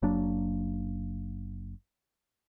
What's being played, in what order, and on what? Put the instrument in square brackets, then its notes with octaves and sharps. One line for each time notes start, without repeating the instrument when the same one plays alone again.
[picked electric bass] F#1 F#3 A#3 D4